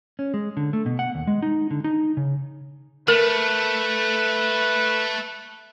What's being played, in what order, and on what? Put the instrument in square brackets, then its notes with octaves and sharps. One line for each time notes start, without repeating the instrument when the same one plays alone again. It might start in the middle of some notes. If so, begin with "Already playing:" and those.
[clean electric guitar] C#4
G#3
D3
A3
B2
F#5
D#2
G#3
D#4
D3
D#4
C#3
[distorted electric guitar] A3 [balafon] A#4 [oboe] B4